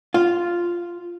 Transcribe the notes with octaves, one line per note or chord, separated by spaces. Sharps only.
F4